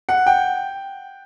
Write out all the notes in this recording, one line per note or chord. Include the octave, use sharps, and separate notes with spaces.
F#5
G5